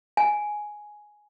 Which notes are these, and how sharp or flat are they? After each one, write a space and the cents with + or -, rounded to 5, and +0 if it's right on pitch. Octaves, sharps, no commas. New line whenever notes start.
G#5 +5